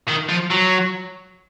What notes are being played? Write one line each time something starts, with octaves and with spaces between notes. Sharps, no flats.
D#3
F3
F#3